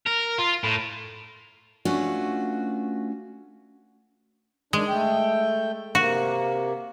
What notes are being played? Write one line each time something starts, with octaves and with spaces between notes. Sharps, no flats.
A#4
F4
A2
A3 C#4 D4 F4 F#4 B4
D#3 G#3 D4
A3 G5
C3 A#3 F#4